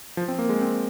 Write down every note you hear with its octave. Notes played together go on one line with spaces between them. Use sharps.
F3
C4
A#3
G#3
C4